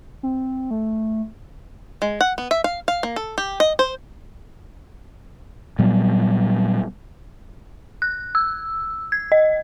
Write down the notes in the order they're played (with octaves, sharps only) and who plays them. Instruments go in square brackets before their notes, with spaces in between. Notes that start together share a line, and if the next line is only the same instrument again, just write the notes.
[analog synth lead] C4
A3
[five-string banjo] G#3
F#5
B3
E5
F5
F5
A#3
A4
G4
D#5
C5
[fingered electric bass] A#2 F#3 G3 B3
[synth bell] F#6
E6
G#6
D#5